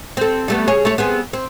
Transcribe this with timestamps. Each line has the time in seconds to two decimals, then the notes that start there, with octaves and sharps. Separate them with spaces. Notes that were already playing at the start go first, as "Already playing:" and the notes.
0.17 C4 A4
0.48 G3 A3 B3
0.68 G#4 C#5
0.85 A3 C#5
0.98 B3 C4 G#4
1.33 C4